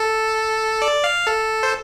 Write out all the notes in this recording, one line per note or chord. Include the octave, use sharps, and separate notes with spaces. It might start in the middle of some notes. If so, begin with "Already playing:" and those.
Already playing: A4
D5
F5
A4
C5